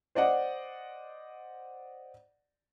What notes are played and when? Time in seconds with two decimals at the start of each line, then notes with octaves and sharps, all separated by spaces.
0.15 C5 D5 D#5 F#5